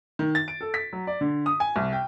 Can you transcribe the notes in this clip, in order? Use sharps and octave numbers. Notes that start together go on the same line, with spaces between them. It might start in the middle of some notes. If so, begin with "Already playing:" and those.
D#3
A6
D7
A4
B6
F#3
D5
D3
D#6
G#5
C2
G5